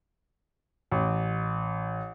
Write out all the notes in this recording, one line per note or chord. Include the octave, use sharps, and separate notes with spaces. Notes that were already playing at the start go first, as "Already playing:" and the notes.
A1